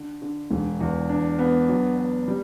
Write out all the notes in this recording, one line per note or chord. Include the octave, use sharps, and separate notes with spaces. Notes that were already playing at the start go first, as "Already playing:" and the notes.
Already playing: D3
D3
E1
E2
D4
B3
F#3
B3
G3